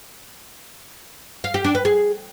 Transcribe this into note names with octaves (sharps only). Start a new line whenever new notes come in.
F5
G4
D4
B4
G#4